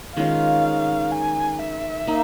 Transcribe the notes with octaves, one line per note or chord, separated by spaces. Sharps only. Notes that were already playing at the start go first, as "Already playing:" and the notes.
D#3 G#3 C#4 F4 F5
G#5
E5
A#3 D#4